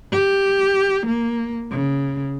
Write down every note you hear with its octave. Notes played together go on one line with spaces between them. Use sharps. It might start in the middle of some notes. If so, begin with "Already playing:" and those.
G4
A#3
C#3